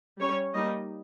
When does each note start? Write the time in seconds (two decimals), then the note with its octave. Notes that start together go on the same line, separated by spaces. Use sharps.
0.19 G3 C#4 C#5
0.54 G3 A#3 D#4 D#5